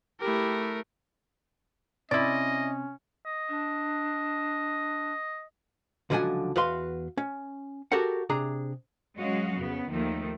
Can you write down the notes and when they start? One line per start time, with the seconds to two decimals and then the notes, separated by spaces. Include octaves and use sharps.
0.20 A3 E4 G4 A#4
2.11 C3 C#4 E4 D5 D#5 C6 F#7
3.25 D#5
3.49 D4
6.10 C#2 D3 F3 F#3 F#5 G#5
6.56 E2 F#4 B4 F5 C6
7.17 C#4
7.92 F#4 G4 A4 A#4 F#5
8.29 C3 D4 G#4 A#5
9.18 F#3 G#3 C#4 F#4 D#5 F5
9.57 F2 C#3 B3
9.90 D#2 D#3 F3 A3